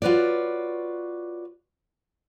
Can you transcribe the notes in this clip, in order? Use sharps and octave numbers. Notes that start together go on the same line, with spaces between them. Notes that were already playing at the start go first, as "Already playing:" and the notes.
F4 F#4 B4 C#5 D5